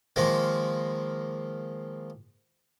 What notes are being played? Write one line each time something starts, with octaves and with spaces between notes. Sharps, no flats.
D#3 F3 G#3 A#3